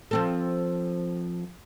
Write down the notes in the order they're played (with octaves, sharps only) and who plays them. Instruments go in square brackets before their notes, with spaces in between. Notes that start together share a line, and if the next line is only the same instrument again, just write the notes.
[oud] F3 C4 A4